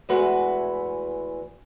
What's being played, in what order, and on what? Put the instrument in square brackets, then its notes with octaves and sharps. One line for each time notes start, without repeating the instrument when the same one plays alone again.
[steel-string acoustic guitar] E2 E3 G#3 A3 F#4 B4